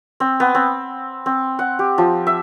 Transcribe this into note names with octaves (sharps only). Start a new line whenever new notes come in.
C4
B3
C4
C4
F#5
G4
F3
E5